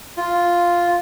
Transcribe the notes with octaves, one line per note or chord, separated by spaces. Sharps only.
F4